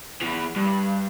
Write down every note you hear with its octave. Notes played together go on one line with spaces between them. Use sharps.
E2 E3
G2